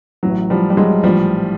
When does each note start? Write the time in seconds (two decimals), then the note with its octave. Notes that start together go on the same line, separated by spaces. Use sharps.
0.23 A1 A2 E3 F#3
0.50 F3 G3
0.70 G3
0.77 F#3 G#3
1.03 A#1 A2 E3 F3 G3